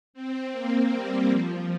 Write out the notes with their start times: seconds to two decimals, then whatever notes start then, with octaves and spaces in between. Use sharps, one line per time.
0.14 C4
0.52 A#3
0.91 G3
1.29 F3